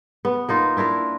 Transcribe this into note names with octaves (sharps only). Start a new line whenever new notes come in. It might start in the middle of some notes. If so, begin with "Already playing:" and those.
B3
A#3 D#4 F4
D4 E4 F4 A#4